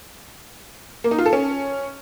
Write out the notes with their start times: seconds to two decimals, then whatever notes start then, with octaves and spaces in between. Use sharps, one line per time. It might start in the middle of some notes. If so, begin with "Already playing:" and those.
1.04 A#3
1.11 D#4
1.18 F4
1.26 A4
1.33 C#4